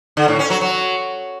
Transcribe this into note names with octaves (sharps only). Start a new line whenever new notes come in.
D3
A2
C#4
F#3
F#3